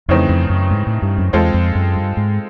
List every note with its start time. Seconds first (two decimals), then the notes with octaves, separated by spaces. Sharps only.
0.08 F2 C#3 E3 A3 C4 D#4
0.29 F2
0.50 F#2
0.71 G#2
0.87 A2
1.02 G2
1.18 F#2
1.33 E2 G#3 C4 F4 A4
1.54 F2
1.75 F#2
1.96 G2
2.17 G#2